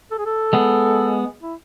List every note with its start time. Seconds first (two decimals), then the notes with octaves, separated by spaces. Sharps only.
0.11 A4
0.18 G#4
0.26 A4
0.53 G#3 B3
1.42 E4